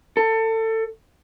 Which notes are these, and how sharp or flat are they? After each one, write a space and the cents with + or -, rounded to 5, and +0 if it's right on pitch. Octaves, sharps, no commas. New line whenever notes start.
A4 +25